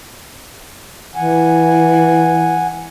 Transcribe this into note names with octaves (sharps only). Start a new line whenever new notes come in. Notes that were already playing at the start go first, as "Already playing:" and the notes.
E3 F#5 G#5